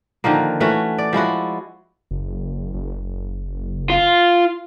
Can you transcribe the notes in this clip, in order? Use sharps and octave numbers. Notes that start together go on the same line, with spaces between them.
D3 D#3 F3 A#3
E3 A3 C#4 F#4
D5
F3 G#3 E4 F#4
F#1
F#1
F4